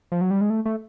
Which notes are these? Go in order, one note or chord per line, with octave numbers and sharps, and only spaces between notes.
F3
F#3
G3
G#3
A3
A3